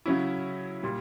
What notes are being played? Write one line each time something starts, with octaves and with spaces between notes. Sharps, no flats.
C#3 F#3 C#4 E4
A#2 G3